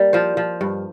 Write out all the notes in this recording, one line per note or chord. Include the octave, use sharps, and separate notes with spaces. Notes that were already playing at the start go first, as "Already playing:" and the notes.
Already playing: G3 A#3
F3 C5
F3
G2